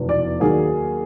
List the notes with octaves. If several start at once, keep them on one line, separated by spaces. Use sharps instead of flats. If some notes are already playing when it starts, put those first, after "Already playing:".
Already playing: F1 E2 B2 F#3 B3
D5
D#2 D#3 F#3 A#3 G#4